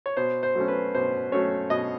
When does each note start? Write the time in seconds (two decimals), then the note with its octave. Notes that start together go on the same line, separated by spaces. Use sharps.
0.06 C#5
0.17 B2 C5
0.43 C5
0.55 F#3 A3 C#4
0.68 B4
0.95 B2 C5
1.32 F#3 A3 C#4 C#5
1.70 B2 D#5